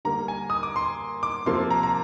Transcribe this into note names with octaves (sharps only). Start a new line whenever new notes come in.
D3 G3 A#3 A#5
G#5
D#6
D6
C6
D6
C3 F3 A#3 C6
A#5
A#5